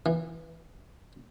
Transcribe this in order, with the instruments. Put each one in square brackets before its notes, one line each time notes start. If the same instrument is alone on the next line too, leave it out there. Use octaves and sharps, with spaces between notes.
[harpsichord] E3